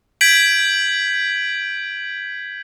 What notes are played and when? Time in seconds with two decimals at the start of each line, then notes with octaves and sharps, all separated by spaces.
0.21 G6 G#6 B6 D7 F#7